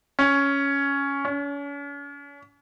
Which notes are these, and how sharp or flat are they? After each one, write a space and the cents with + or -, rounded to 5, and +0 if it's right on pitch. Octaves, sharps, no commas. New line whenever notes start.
C#4 +5
C#4 +40